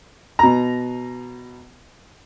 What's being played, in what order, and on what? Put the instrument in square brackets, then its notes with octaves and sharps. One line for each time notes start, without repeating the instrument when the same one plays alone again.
[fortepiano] B2 A#5